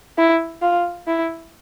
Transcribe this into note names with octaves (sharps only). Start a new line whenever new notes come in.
E4
F4
E4